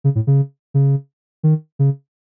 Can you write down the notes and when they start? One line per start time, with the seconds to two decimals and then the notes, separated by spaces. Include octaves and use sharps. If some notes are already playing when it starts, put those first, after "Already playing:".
0.04 C#3
0.15 A2
0.27 C#3
0.74 C#3
1.43 D#3
1.79 C#3